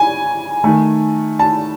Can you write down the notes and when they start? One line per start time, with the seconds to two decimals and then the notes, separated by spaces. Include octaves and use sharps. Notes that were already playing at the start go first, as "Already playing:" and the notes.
Already playing: G#5
0.64 D#3 A3
1.39 A5